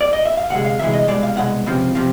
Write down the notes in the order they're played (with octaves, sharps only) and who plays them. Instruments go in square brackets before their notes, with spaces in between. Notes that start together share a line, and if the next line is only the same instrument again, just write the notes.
[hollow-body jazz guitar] D5
D#5
E5
F5
D2 C3 G#3 F#5
F5
D2 C3 E3 G#3 E5
D#5
C2 B2 G#3 D5
F5
C2 B2 G#3 F#5
C#2 C3 F3
C3 F3